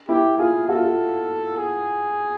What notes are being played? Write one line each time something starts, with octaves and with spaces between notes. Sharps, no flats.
E4 G4
F4 G#4
F#4 A4
F4
F#4
G#4